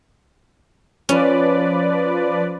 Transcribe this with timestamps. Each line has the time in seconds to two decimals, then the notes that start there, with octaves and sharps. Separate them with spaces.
1.09 F3 C#4 B4 D5